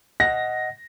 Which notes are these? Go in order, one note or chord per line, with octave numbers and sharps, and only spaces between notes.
D#5 F#5 A#6